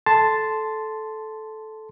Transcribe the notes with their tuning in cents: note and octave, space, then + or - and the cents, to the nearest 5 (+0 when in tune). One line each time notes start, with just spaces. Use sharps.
A4 -15 A5 +0 C6 -10